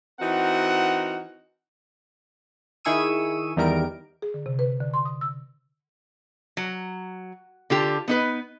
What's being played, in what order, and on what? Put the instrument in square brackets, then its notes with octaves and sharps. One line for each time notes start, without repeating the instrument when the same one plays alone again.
[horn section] E3 C4 D#4 F#4 A#4 F#5
[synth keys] D#3 E4 G#4 C#6 E6 D#7
E2 D#3 G3 A#4 D7
[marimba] G#4
D3
C3
B4
D3
C6
D#6
E6
[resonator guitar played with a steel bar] F#3
D3 F4 G4
B3 D#4 B4